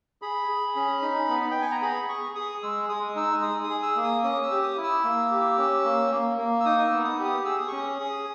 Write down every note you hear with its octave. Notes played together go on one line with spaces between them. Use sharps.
G#4 B5
G#4
C#4
D#4
B3
B3 G5
G#5
A#5
G#4 B5
G#4 C#6
G#4 D#6
G#3 E6
G#3 D#6
D#4 E6
G#4 D#6
D#6
G#4
E6
A#3
D#6
C#4 D#6
E6
G4
D#6
E4
E6
A#3
G4
C#4
A#3
A#3
A#3
E6
D#4 D#6
E6
B3
D#6
G4
D#6
G#4 E6
D#6
C#4 C#6
D#6
G#4